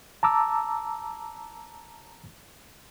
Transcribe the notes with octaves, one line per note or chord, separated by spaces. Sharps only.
A5 A#5 D6 E6